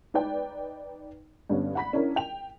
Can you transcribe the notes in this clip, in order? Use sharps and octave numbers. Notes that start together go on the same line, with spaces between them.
D#4 B4 D5 G5
G2 D3 B3 C#4
F#5 B5 B6
C#4 D4 E4 A#4
G5 F7